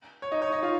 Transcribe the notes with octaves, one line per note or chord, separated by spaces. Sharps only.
C#5
D#4 D#5
C#5
D#4 D#5
F4 F5